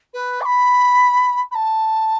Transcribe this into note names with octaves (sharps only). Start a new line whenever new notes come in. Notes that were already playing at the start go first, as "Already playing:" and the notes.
B4
D6
B5
B5
A5